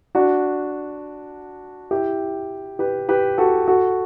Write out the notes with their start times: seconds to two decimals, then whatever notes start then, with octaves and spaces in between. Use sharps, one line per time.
0.15 D4 F#4
1.91 E4 G4
2.79 G4 B4
3.09 G4 B4
3.38 F#4 A4
3.68 F#4 A4